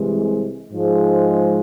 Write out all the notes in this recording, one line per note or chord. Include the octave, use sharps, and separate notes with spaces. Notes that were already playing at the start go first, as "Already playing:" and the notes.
Already playing: C2 C3 E3 G#3
G#2 F3 G#3